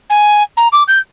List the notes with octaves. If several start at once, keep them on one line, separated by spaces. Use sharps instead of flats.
G#5
A#5
D6
G6